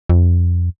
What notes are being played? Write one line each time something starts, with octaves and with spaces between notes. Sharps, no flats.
F2